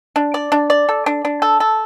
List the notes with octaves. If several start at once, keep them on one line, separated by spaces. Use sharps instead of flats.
D4
D5
D4
D5
A4
D4
D4
A4
A4